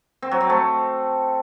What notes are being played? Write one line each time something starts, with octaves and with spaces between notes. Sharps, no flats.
C4
F#3
C4
A3